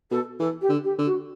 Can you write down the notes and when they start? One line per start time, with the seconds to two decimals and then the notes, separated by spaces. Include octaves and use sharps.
0.10 B2 A4
0.39 E3 A4
0.61 G4
0.69 D3
0.83 G4
0.98 D3
1.05 F#4